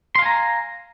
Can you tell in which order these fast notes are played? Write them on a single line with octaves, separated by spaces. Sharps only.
C6 F5 G#5 A#5